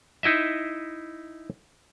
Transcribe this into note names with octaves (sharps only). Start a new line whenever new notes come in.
D#4 E4 D#5 E5